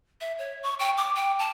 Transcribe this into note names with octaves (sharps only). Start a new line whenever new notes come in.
E5
C#5
C#6
G5
D6
G5
A5